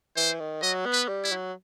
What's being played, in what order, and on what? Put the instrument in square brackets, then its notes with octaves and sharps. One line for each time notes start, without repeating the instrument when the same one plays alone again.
[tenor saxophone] E3 [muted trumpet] C5
[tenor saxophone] D#3
[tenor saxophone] F#3 [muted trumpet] D#5
[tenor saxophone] B3
[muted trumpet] B4
[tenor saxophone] G3
[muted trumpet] E4
[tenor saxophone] F#3